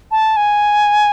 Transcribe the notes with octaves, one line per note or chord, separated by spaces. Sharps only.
A5
G#5